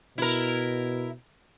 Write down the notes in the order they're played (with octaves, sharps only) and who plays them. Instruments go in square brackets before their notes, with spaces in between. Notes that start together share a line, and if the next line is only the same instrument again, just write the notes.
[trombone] B2 [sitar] E4 A#4